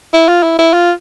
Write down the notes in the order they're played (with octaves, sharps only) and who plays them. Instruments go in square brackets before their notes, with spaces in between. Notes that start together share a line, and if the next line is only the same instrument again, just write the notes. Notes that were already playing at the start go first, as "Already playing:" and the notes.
[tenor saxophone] E4
F4
E4
E4
F4